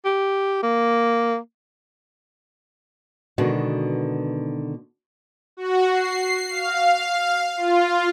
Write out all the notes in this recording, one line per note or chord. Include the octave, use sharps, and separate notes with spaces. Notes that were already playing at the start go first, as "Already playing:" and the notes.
G4
A#3
B2 D3 D#3 G#3 B3 F#4
F#4
C7
F5
F4